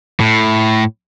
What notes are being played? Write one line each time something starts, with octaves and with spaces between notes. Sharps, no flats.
A2